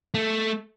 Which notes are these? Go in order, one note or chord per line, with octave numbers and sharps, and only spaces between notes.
A3